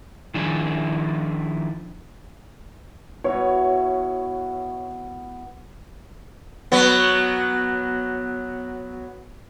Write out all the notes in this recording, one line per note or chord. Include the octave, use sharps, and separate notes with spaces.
D#3 F3 D4 E4 G#4
B2 E4 F#4 C#5
F#3 B3